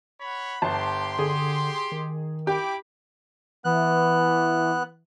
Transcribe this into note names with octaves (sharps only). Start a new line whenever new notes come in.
C#5 F#5 B5
G1 G4 A5 C6
D3 G#4
D#3
E4 G4 B5 D6
E3 B3 F#6